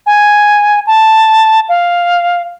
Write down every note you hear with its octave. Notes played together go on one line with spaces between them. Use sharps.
G#5
A5
F5